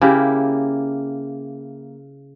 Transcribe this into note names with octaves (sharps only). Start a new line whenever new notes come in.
C#3 A#3 E4 G4